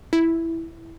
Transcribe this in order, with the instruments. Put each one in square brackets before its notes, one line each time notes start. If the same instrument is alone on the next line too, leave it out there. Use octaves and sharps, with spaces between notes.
[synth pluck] E4